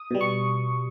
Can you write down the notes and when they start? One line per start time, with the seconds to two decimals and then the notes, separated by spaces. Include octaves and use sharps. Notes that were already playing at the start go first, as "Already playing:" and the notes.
Already playing: D#6
0.11 B2 G3
0.21 C#6